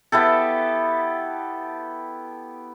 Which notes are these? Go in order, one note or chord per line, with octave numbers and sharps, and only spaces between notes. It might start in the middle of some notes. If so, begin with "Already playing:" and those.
B3 E4 G4 A4